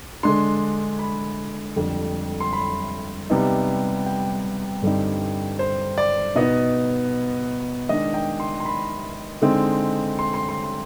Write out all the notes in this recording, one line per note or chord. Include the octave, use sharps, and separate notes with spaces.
D3 G#3 D4 C6
B5
F2 D3 G3
C6
B5
C3 G3 B3 D#4
G5
G2 D3 G3 C4 D#4
C5
D5
B2 B3 D#4 D#5
D#3 G#3 D4 D#5
G5
C6
C6
B5
D3 G#3 C4 D#4
C6
C6
C6
C6